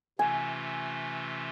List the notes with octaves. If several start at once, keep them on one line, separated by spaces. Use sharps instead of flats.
C3 E3 A3 C#4 F4 G#5